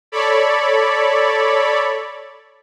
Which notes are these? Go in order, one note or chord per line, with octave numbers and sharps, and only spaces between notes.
A4 C#5 D5 B5